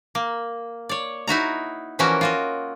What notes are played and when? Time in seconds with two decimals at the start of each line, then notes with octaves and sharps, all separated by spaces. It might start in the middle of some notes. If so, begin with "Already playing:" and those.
0.15 A#3
0.89 C#5 D5
1.28 D#4 E4 F#4 A#5
1.99 E3 F3 A#3 C#4 F#4 A#4
2.21 F4 F#4 D#5